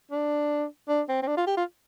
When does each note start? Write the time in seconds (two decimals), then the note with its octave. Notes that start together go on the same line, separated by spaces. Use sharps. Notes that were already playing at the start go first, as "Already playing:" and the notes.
0.11 D4
0.88 D4
1.08 C4
1.22 C4
1.27 D4
1.37 F4
1.47 G4
1.57 F4